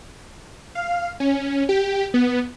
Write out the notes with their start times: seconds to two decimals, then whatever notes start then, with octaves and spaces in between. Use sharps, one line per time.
0.75 F5
1.20 C#4
1.69 G4
2.14 B3